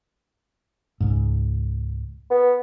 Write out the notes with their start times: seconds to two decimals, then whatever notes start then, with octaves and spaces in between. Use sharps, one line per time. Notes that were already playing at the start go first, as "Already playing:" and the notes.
1.00 C#2 G#2
2.31 B3